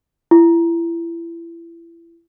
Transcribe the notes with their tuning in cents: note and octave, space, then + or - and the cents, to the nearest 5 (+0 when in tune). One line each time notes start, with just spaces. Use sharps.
E4 +30